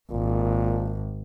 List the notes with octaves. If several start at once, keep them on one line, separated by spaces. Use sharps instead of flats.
G#1 A#2